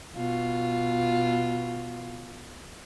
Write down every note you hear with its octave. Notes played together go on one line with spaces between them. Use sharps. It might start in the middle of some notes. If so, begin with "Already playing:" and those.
B2 F4